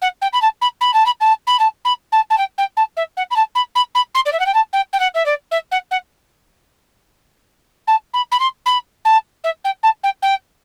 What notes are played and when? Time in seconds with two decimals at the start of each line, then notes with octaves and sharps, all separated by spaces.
0.02 F#5
0.22 G5
0.33 B5
0.42 A5
0.61 B5
0.81 B5
0.94 A5
1.06 B5
1.21 A5
1.47 B5
1.59 A5
1.85 B5
2.12 A5
2.30 A5
2.38 G5
2.58 G5
2.77 A5
2.97 E5
3.17 F#5
3.31 B5
3.36 A5
3.55 B5
3.75 B5
3.95 B5
4.15 C6
4.26 D5
4.32 E5
4.40 F#5
4.46 G5
4.54 A5
4.73 G5
4.93 G5
5.00 F#5
5.14 E5
5.26 D5
5.51 E5
5.71 F#5
5.91 F#5
7.87 A5
8.14 B5
8.32 B5
8.40 C6
8.66 B5
9.05 A5
9.44 E5
9.64 G5
9.83 A5
10.03 G5
10.22 G5